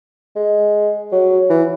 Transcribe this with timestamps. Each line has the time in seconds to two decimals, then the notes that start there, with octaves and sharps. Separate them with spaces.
0.36 G#3
1.12 F#3
1.50 E3